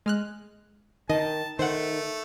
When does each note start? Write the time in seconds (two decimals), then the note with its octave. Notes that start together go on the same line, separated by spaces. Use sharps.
0.06 G#3 F6 F#6
1.09 D#3 D#5 A5
1.59 D#3 A3 C5 F#5